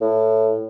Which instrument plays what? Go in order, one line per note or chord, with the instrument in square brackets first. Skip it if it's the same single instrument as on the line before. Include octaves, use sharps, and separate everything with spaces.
[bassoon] A2